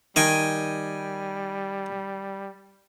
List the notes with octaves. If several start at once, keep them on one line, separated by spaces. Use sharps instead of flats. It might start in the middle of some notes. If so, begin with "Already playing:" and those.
D#3 G3 D#5 G5 G#5